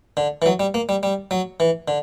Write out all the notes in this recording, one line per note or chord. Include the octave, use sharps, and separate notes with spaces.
D3
E3
F#3
G3
A#3
G3
G3
F#3
E3
D3